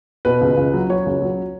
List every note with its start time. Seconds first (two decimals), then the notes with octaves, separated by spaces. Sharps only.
0.25 B2 B4
0.41 C#2
0.57 C#2
0.74 F#3
0.89 F#3 C#5
1.06 C#2
1.22 F#3